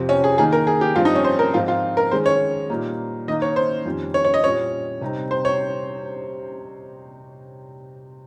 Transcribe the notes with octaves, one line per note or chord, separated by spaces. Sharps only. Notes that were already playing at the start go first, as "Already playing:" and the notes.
Already playing: F2 C3 F3 C4
C#4
G#4
D#3 A#3 D#4 G#4
A#4
G#4
G4
G2 F3 C4 F4
D#4
C#4
C5
A#4
G#2 F3 C4 D#4 F4
F4
A#4
D#3 G#3 C#4 C5
C#5
A#2 G3 A#3 D#4
D#3 A#3 D#4 D#5
C#5
C5
F2 D#3 G3 C#4
C#5
C#5
D#5
A#2 G3 C#4 C#5
C3 G3 C4 D#4
C5
C#5